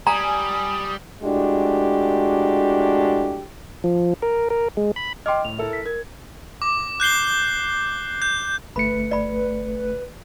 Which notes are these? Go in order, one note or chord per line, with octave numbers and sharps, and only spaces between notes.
G3 G#5 A#5 D#6
A2 G#3 D4 F#4 G4
F3
A#4
A#4
G#3
B5
D#5 G5 C6 D6 F6
A2 F7
E4 A4 A#4
B6
A#4 G#6
D6
F#6 G6 C7 G7
G6
G1 A3 B4 B5 C#7
D5 B5